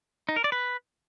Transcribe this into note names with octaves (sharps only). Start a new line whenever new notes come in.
D#4
A#4
D5
B4